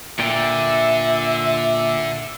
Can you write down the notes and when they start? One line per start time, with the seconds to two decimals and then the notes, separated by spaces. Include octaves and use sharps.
0.19 A#2 D3 D5 E5 G5